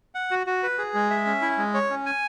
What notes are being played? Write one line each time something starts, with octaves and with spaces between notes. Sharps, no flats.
F#5
F#4
F#4
B4
G#4
G#3
E5
C#4
E4
G#3
C#5
C#4
G#5